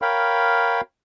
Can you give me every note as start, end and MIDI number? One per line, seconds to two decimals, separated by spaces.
0.02 0.81 70
0.02 0.81 73
0.02 0.81 77
0.02 0.81 79
0.02 0.81 83